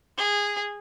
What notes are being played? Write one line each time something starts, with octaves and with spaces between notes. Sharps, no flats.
G#4